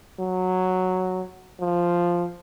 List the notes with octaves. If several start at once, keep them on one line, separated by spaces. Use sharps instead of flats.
F#3
F3